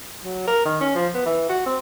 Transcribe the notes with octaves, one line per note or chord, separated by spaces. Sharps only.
F#3
A#4
D#3
C#4
F3
B3
E3
F#4
C4